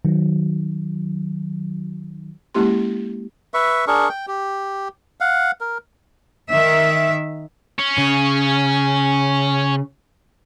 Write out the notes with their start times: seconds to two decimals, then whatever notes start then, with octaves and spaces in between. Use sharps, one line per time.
0.05 D#3 F#3
2.55 G#3 A#3 C#4 E4 G4 C6
3.54 B4 E5 C#6
3.87 D4 G#4 A#4 C#6
4.09 G5
4.28 G4
5.20 F5 F#5
5.61 A#4
6.50 D#3 E5
7.79 C#4
7.98 C#3